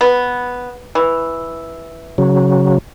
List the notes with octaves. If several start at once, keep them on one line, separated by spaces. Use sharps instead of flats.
B3
E3
C#3 F#3